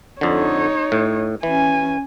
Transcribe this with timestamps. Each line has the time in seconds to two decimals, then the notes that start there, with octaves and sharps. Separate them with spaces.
0.21 F2 D3 D#4 C#5
0.92 A2
1.43 E3 C#4 G#5